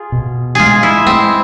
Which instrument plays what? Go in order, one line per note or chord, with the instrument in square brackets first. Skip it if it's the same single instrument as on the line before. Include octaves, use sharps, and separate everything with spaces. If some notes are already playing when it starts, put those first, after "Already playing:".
Already playing: [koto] F4 G#4
[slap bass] B2
[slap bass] G#3 [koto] F4 G#4
[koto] E4
[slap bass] G#3 [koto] C4